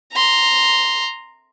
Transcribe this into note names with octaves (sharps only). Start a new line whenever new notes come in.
A#5 C6